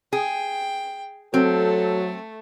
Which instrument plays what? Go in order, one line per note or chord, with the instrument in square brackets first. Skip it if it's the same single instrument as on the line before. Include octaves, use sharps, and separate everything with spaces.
[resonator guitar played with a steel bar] G#4 [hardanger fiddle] G5
[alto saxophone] F#3 [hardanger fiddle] A3 [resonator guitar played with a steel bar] C4 [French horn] A4